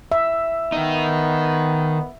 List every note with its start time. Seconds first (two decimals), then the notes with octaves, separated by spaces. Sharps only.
0.12 E5
0.72 D#3 B3 D#4